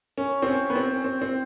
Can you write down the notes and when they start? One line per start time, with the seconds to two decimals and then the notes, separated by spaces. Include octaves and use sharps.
0.18 C#4
0.42 C4
0.46 C#4
0.70 B3
0.75 C4
0.94 C#4
1.04 C4
1.22 C4